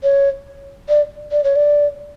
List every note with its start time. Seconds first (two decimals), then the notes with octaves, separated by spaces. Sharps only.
0.03 C#5
0.89 D5
1.32 D5
1.44 C#5
1.56 D5